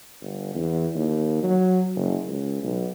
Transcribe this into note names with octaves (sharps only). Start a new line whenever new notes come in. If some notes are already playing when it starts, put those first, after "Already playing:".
G1
E2
D#2
F#3
F#1
C#2
B1